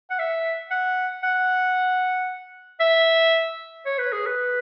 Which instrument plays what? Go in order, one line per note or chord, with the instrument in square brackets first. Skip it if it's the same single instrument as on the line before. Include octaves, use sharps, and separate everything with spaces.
[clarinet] F#5
E5
F#5
F#5
E5
C#5
B4
G#4
B4